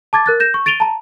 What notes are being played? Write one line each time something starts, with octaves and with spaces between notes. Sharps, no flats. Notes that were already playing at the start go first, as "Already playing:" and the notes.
A5 D6 G#6 A6
A#4 F#6 A6
G6 A#6 E7
C#6
A6 D7 D#7 F7 G7
A5 A#5